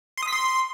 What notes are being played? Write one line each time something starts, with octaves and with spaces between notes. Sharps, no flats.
C6
D#6
B6
C6